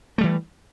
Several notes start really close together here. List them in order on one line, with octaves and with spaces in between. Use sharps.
A3 G3 E3